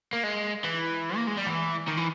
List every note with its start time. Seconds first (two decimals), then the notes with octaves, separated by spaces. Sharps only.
0.13 A#3
0.24 G#3
0.64 E3
1.16 A#3
1.27 G#3
1.37 G3
1.47 E3
1.88 D#3
1.97 E3